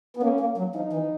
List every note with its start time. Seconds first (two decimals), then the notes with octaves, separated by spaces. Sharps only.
0.17 B3
0.23 A#3 C#4
0.40 A#3
0.58 F#3
0.75 F3 D#4
0.93 E3